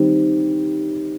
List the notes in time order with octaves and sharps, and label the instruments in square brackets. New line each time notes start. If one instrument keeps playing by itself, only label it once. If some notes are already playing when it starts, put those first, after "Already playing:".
Already playing: [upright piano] D#3 G3 C4